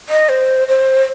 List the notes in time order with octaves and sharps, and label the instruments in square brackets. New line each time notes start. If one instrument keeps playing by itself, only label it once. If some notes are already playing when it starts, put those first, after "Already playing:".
[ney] D#5
C5
C5